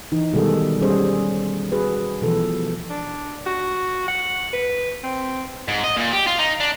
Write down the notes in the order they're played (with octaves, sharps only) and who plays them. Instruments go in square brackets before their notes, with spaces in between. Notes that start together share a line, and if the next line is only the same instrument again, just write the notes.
[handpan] E3 D#4
B2 D#3 G3 G#3 G#4 A4
G3 C#4 G#4 C5
F#4 G#4 B4
B2 E3 F3 A4
[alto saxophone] D4
F#4
F#5
B4
C4
[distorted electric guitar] G#2
D#5
A#2
G4
F4
D#4
D4